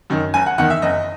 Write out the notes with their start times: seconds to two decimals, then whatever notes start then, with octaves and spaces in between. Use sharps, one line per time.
0.10 F#2 D#3
0.34 F#1 G#5
0.46 F#5
0.58 E2 D#3 F#5
0.70 E5
0.82 F#1 D#5